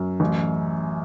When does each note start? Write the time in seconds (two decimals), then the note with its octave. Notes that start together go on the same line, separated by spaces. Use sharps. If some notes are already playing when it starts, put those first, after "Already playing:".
Already playing: F#2
0.20 A1